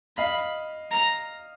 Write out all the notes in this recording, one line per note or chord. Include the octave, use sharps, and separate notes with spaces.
D#5 F5 B5
A#5